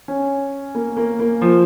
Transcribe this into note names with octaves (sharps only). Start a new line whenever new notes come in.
C#4
A#3
A#3
A#3
F3